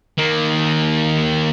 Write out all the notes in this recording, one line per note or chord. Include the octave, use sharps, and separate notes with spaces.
D#3 A#3